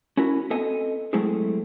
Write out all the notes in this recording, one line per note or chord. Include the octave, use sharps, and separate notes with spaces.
C#4 E4 F#4 A#4
B3 C4 A4 D#5 G#5
F#3 G#3 A3 C4 E4 G#4